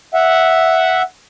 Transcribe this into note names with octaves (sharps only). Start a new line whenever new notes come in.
E5 F#5